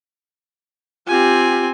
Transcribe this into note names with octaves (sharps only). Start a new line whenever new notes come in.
C4 F4 G4 G#5